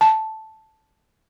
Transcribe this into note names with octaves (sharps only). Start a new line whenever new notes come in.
A5